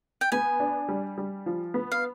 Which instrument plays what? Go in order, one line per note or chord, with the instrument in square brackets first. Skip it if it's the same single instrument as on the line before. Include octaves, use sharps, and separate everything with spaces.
[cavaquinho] G5
[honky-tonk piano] B3 [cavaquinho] G#5
[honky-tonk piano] D4
G3
G3
F3
B3
[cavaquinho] F5